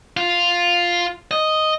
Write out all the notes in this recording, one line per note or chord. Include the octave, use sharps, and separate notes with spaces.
F4
D#5